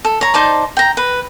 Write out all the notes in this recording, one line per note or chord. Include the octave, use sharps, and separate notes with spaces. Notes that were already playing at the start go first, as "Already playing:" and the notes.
A4
C#5 A#5
D#4 C5 D5 A5
G5 A#5
B4